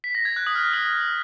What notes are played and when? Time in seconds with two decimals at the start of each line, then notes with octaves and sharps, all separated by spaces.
0.04 B6
0.15 A#6
0.25 G#6
0.36 F#6
0.47 D#6
0.55 F6
0.73 D#6